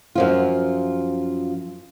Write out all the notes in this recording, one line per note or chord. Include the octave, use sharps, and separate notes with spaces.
F#2 F3 F4